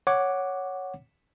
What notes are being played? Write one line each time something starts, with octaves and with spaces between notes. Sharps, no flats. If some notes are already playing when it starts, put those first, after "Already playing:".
C#5 F#5 D6